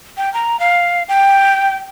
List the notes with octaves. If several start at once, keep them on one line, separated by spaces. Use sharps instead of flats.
G5
A#5
F5
G5